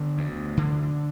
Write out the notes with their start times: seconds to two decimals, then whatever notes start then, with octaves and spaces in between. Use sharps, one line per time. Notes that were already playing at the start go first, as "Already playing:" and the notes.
Already playing: D3 B3
0.18 D2
0.57 D3